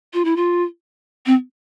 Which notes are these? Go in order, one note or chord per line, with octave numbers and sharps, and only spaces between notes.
F4
E4
F4
C4